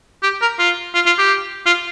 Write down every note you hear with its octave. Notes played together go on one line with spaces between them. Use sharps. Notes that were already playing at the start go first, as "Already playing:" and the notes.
G4
A#4
F4
F4
F4
G4
F4